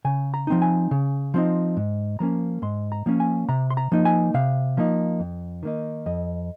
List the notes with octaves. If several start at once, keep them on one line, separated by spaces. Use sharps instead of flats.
C#3 G#5
A#5
F3 C4 D#4
G#5
C#3
F3 C4 D#4
G#2
F3 A#3 C#4 A#5
G#2 C6
A#5
F3 A#3 C#4
G#5
C3 A#5
C6
A#5
F3 A#3 D#4
G#5
C3 F5
F3 A#3 D#4
F2
D#3 A#3 D#4
F2 D#5